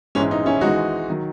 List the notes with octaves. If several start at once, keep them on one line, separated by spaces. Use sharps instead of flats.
A#1 G#2 E3 G#3 C#4
D#4
C#4 E4
G#1 G#2 E3 G#3 D#4 F#4
D#3 F#3